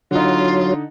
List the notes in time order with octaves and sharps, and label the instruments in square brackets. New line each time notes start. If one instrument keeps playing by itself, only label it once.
[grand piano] D3 D#4 [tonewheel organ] F#3 [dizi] F4